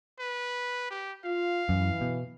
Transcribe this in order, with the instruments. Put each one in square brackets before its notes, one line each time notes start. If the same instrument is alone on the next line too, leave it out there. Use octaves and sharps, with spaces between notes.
[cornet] B4
G4
[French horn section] F4 [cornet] F5
[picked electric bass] F#2 [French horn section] E3
[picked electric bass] B2